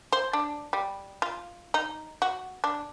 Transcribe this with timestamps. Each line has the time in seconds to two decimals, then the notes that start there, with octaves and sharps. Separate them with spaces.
0.13 C5
0.33 D4
0.73 G3
1.22 F4
1.74 D#4
2.22 F#4
2.64 D4